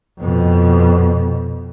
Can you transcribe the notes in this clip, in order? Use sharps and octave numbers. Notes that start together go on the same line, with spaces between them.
F2 B2